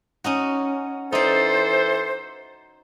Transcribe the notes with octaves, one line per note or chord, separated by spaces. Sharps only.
C#4 D#4 F#4
E3 D#4 A4 C5 D5